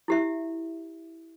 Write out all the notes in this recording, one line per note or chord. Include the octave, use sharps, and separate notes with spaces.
E4 G4 E5